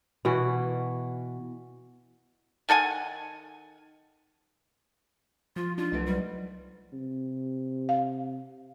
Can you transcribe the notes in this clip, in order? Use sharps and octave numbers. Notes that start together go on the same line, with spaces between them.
B2 E3 F#4
D#3 A4 F#5 G#5
F3 F4
F3 D4 D#4 F4
C2 F#3 A3 B4 D#5 D7
G3
C3
F5